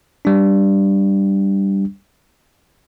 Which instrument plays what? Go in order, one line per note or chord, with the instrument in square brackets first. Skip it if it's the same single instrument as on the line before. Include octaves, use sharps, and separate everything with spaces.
[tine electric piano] G3 D4